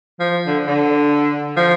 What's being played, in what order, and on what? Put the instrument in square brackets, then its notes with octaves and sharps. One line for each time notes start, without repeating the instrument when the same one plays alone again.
[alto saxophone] F3
D3
D3
F3